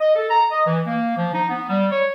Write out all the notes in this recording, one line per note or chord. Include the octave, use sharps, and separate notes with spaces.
D#5
A4
A#5
D#5
E3
A#3
F3
D#4
B3
G3
C#5